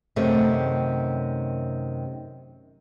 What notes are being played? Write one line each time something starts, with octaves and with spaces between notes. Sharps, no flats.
F#2 C3 D#3 A3